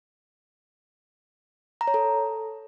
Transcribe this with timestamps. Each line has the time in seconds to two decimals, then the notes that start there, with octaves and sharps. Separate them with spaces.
1.81 A#5
1.87 C#5
1.94 A4